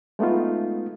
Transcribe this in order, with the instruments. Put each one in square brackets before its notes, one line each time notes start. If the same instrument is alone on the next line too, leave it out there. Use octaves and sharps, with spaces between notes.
[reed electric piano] G#3 A3 B3 D#4 F4